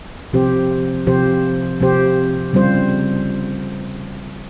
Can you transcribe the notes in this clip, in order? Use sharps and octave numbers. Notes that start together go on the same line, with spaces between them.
C3 F3 C4 G4 C5
C3 F3 C4 G4 C5
C3 F3 C4 G4 C5
C#3 G3 C4 F4 C5